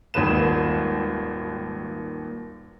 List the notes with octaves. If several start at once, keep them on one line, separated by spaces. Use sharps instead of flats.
D#1 G#1 D#2 D#3 B4 E7